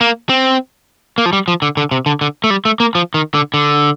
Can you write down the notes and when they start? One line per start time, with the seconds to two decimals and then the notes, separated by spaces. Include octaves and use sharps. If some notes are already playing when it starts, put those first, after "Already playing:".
0.01 A#3
0.29 C4
1.18 A#3
1.26 F3
1.33 G3
1.48 F3
1.62 D3
1.77 D3
1.91 C3
2.06 D3
2.21 D3
2.44 A3
2.50 G3
2.65 A3
2.80 A#3
2.95 F3
3.14 D#3
3.34 D3
3.54 D3